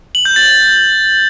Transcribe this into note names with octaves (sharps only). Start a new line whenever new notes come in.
F#7
G6
A6